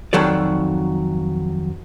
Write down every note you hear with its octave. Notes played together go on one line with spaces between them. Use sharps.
F2 D#3 F#3 A4 D5